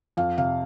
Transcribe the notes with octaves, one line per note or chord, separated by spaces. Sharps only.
F2 F5
C3 F5